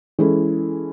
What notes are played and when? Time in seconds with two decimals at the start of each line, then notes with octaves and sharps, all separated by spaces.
0.19 E3 G#3 C#4 E4 A4